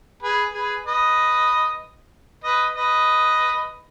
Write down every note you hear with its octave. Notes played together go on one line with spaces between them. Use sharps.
G#4 B4
G#4 B4
B4 D#5
B4 D#5
B4 D#5